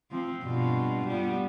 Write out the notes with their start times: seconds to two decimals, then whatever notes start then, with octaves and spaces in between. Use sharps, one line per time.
0.11 F3 C4
0.43 G2 B2 F4
1.07 G3 B3